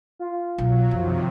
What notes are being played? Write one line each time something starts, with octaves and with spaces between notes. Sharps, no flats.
F4
B1 F#3
F#2 C3 D#3 F3